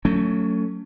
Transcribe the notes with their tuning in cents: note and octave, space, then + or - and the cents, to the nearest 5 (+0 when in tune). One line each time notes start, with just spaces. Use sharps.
F#3 +0 A3 +30 C#4 +25